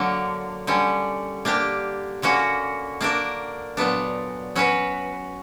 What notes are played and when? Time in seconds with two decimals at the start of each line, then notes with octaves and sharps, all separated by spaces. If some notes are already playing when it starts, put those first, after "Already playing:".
Already playing: D3 F#3 A#3
0.67 D3 G3 C#4
1.45 A#3 D4 G4
2.22 D3 A#3 C#4 F#4
3.01 A#3 D4 A#4
3.77 A#2 F#3 B3 D4
4.55 F#3 C#4 F#4 B4